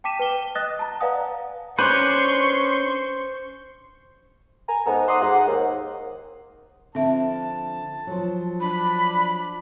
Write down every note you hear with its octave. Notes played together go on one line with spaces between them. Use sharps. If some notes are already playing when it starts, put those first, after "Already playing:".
G5 A5 D6 B6 D#7 E7
B4 G5 G7
D#5 D#6 F#6 A6 A#6
A5 A#5
B4 D5 F5 F#5 G#5 D#6
C#4 D4 B4 C5 C6 C#6
G#5 A#5
G#2 B3 A4 A#5
F#5 A#5 C6 D6 D#6
G#2 G#3 F#5
D#2
D3 F3 C4 E5 A5
F3 F#3
D4 B5